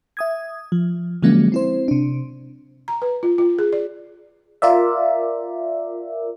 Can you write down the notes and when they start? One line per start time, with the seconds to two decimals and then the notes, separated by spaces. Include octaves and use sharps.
0.17 E5 D#6 G#6
0.72 F3
1.23 D3 F3 F#3 G#3 A#3 C#4
1.52 C4 E4 C5
1.88 C3 D4
2.88 A#5
3.02 B4
3.23 F4
3.38 F4
3.59 G#4
3.73 D5
4.62 F4 A#4 D5 E5